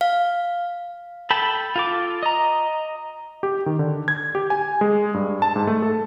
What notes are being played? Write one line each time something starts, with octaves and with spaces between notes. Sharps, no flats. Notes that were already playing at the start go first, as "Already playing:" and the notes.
F5
A4 G5 A5 B5
F4 A4 D6
D#5 A#5
G4
D#3
D3
G#6
G4
G#5
G#3
G2
A5
G#2
A3
A4